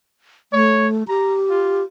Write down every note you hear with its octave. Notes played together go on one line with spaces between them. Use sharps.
A3 C#5
G4 A#5
F4